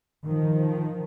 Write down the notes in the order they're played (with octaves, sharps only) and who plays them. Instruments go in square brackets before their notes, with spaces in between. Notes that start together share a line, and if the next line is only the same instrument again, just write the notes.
[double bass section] D#3 F3